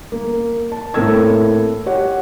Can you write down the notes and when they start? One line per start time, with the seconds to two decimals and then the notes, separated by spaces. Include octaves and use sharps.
0.12 A#3
0.72 A5
0.94 A2 A#3 C4 A4 E6 G#6
1.86 G4 C#5 F#5